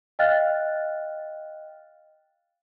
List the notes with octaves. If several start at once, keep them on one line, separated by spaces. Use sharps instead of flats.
D#5 F5 G5 F6 F#6 A6